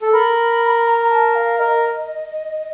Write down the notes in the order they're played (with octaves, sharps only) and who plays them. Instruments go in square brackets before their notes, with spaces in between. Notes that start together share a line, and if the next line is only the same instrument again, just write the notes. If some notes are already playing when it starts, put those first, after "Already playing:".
[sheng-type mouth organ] A4
[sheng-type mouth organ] A#4 [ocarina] B5
[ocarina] A#5
A5
F5
[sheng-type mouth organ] A#4 [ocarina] D#5